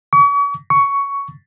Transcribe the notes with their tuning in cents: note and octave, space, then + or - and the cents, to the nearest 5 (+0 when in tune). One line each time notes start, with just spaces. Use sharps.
C#6 +40
C#6 +10